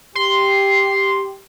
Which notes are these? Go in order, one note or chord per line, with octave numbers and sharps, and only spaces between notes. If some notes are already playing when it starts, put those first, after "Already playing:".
G4 C6